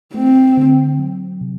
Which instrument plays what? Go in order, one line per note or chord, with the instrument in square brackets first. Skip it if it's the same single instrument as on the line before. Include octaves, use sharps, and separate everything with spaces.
[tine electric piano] A3 [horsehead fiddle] C4
[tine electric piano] D3
F#3
C3